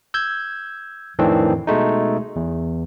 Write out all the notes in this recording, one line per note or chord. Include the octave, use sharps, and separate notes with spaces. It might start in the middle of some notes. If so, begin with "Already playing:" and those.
E6 G6 G#6
F2 A2 D#3 E3 C4 D4
B2 G#3 A3 D#4
E2